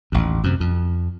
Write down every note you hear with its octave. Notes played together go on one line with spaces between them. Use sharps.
A1 D#2
F#2 C3
F2